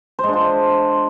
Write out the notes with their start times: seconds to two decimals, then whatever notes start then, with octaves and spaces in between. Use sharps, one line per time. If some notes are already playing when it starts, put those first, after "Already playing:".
0.19 C5
0.23 G#3
0.28 D4
0.33 F4